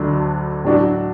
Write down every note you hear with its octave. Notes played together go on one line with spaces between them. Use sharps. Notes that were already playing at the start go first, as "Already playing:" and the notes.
Already playing: D2 D3 F#3 D4
A2 F#3 D4 F#4